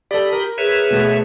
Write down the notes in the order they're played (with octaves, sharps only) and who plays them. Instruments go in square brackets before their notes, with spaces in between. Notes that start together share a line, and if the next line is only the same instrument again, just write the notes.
[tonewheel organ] G4 B5 D#6 [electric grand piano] A4 D5
[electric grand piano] A#4
[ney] G#4 [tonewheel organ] B4 C#5 E5
[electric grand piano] B2 A3 B3